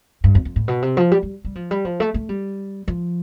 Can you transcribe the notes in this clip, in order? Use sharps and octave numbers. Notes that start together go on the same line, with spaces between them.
G2
F2
F2
A2
B2
C3
F3
G3
G3
G3
F3
G3
F3
A3
A3
G3
F3